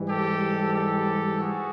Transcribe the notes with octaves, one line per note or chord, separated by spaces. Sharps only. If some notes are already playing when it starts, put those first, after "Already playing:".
Already playing: G#2 E3 G3
G4 A4
G4 A4
F#4 G#4